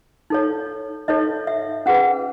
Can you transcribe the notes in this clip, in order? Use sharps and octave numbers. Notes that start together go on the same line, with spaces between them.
D#4 A4 C#5
D#4 A4 C#5 D#5
E5
C#4 G#4 B4 F#5